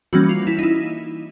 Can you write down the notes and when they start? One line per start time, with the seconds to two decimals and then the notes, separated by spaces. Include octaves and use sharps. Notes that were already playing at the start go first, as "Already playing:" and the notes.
0.13 E3 G3 A#3 C#4 F#4
0.29 F4
0.47 E4
0.59 D#4
0.63 E4